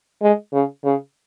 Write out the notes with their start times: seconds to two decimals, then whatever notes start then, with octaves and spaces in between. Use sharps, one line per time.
0.22 G#3
0.53 C#3
0.84 C#3